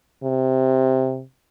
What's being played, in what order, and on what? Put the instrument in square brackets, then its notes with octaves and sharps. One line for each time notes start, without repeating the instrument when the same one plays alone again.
[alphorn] C3